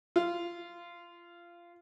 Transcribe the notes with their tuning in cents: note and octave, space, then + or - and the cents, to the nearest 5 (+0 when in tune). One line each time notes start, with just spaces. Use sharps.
F4 -20